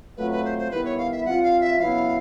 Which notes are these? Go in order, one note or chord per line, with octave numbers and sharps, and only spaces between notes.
F#3 A3 C4 F4 B4
B4
C5
C5
D#3 G3 B3 E4 B4
C#5
F5
E5
G3 C4 F4 F#5
F5
E5
C#3 F#3 B3 E4 F5